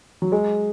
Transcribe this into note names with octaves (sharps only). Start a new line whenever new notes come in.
F#3
G#3